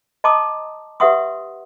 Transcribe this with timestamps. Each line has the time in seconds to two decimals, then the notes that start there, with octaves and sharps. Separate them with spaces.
0.24 D#5 A5 A#5 C6 D6 D#6
1.00 G4 B4 E5 F#5 C6 D#6